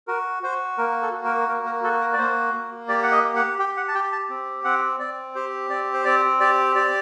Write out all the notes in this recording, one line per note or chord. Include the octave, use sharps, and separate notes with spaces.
F#4 A#4
F#4 C5
A#3 A#4
A4
F#4
A#4
A#3 A#4
A#4
F#4 A4
A#4
D5
A#3 C5
A#3
G4 D5
F#5
D#5
G4
F#5
G4 G5
F#5
A5
G4 G5
A5
C4
C4 F#5
C4 D5
G4 C5
C4 D5
C5
C4 D5
G4 D5
G4 D5